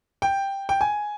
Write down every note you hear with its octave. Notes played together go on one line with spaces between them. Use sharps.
G5
G5
G#5